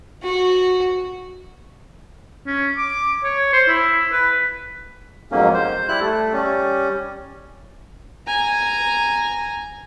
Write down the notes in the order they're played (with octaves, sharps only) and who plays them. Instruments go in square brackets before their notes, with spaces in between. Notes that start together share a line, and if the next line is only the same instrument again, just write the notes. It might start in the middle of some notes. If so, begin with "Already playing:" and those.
[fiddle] F#4
[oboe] C#4
D6
C#5
C5
E4
B4
[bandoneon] F2 G#2 F#3 A#3 C#4
C5
G3 E4 F#6
A3
G3 C#4
[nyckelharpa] G#5 A#5